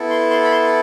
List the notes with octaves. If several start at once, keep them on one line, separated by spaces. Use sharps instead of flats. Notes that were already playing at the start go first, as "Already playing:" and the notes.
Already playing: B3 E4 A4
C6
C6
B5
C6